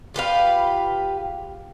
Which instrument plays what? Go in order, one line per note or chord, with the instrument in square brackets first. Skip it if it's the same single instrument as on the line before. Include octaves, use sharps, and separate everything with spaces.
[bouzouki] F4 G4 B4 F5